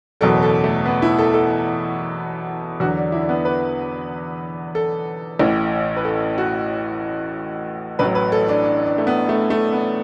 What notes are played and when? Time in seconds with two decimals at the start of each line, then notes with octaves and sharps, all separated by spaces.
0.21 F#1 E2 B2 F#3 A4
0.43 A4
0.64 A3
0.86 B3
1.02 E4
1.18 A4
1.34 A4
2.80 E2 D3 F#3 F#4
2.97 D4
3.12 E4
3.22 D4
3.29 B3
3.45 B4
4.75 A4
5.39 A1 A2 E3
5.97 B4
6.05 A4
6.38 F#4
7.99 A1 A2 F#3 B4
8.15 B4
8.32 A4
8.48 D4
8.64 D4
8.86 D4
8.98 A3
9.07 B3
9.29 A3
9.50 A3
9.72 B3